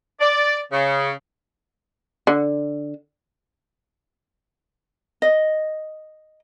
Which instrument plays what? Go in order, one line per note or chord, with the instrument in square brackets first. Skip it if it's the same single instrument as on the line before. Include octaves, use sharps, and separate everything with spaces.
[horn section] D5
C#3
[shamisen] D3
[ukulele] D#5